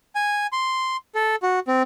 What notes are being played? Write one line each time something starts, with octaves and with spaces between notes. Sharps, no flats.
G#5
C6
A4
F#4
C4